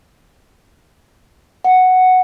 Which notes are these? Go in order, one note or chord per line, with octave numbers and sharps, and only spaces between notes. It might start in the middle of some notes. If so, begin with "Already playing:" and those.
F#5